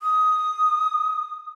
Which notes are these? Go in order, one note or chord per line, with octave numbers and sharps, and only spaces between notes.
D#6